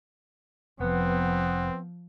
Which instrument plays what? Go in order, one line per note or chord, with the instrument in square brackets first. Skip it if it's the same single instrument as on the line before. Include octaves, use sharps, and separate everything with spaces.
[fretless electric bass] F1 [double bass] F3 [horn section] B3 [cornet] C4